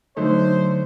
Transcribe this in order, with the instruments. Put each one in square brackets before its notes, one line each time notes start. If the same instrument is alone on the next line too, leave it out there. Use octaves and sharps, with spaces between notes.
[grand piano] D3 A3 D#4 [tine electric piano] F#3 A4 [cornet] C5